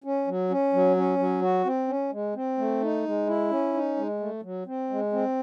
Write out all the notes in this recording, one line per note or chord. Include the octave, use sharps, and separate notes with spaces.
C#4
F#3
C#4
F#3
C#4
F#3
F#4
C4
C#4
G#3
C4
A3
D#4
G#3
E4
C#4
D#4
G#3
A3
F#3
C4
G#3
C4